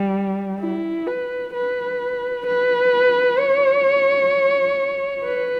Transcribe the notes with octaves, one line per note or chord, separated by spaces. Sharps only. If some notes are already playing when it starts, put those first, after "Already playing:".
Already playing: G3
E4
B4
B4
B4
C#5
B4